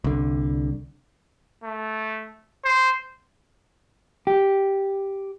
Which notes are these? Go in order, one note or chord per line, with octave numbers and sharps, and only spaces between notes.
C2 D3
A3
C5
G4